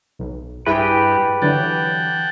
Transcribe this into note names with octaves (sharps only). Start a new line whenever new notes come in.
B1
G2 E4 G4 G#4 B4 G5
D3 E3 F#3 F#5 G5 A5